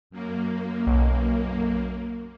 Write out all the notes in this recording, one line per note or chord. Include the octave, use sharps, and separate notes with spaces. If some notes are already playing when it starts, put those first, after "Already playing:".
F#2 A#3
B1